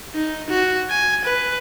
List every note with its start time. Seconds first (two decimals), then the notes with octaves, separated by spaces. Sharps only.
0.14 D#4
0.49 F#4
0.90 G#5
1.25 B4